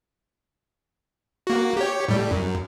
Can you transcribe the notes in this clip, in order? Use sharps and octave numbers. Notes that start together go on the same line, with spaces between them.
A#3 F#4
G4 C#5
A2 G3
F#2